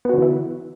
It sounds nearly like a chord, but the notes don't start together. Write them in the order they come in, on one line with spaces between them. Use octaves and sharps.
B3 F#4 D3 E3 E4